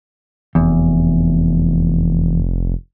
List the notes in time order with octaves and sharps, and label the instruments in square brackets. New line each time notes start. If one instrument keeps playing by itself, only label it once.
[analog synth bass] F1 [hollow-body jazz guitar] E2